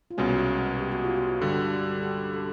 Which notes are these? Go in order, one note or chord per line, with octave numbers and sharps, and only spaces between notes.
F4
C2 B2 G#3 C#4 F#4
G4
F#4
F4
F#4
G2 D3 G3 G4
G4
A4